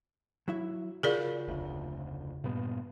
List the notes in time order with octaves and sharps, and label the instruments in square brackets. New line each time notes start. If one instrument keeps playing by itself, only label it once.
[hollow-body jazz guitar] F#3 E4 E5
[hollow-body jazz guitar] C#3 F4 F#4 [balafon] G#4 A#4 D5
[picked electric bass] F1 D2
G2 A#2 B3